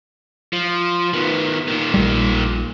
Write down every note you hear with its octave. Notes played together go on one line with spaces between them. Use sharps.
F3
D#3 B3
A#2 D#3
A#1 G3